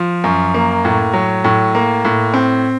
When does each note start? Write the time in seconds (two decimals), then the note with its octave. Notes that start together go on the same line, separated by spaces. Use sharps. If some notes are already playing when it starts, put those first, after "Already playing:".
Already playing: F3
0.24 F#2
0.54 A#3
0.85 A2
1.13 F#3
1.44 A2
1.75 A#3
2.05 A2
2.34 C4